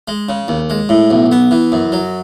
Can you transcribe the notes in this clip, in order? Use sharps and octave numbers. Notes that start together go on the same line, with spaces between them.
G#3
C#3
D#2
G#3
A2
B1
B3
E3
F#2
F#3